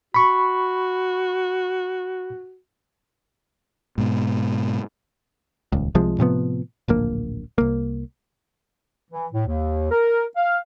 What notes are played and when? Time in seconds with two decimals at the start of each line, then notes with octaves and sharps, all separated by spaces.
0.14 F#4 B5 C#6
3.98 G#2 B2
5.72 D#1 C#2
5.95 C2 C3 F3 G#3
6.19 A2 C3 F3 B3
6.88 D1 A#1 A#3
7.58 C2 A#3
9.11 E3
9.32 A2
9.46 D#2
9.91 A#4
10.36 F5